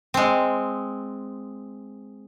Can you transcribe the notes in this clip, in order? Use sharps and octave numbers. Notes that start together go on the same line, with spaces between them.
G#3 C4